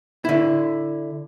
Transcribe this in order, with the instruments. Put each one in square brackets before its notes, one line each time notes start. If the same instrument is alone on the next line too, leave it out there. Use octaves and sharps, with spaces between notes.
[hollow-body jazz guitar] D3 E4